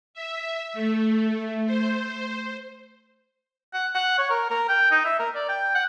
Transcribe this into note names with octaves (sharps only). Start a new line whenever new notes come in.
E5
A3
C5
F#5
F#5
C#5
A#4
A#4
G5
D#4
E5
A#4
D5
G5
F#5